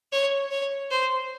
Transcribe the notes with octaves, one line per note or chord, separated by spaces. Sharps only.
C#5
C#5
C5